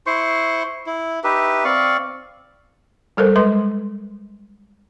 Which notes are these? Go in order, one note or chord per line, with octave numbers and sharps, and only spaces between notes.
E4 C5 C6 C#6
E4
D#4 G4 B4 E5
C4 D5 F5 C#6
G3 A4 A#4 C5
G#3 B4 C6